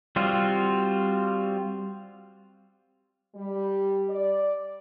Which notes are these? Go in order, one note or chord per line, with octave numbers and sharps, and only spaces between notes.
G3 C4 F4 F#4
G3
D5